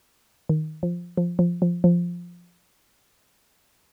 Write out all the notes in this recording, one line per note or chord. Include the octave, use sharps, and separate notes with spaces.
D#3
F3
F3
F3
F3
F3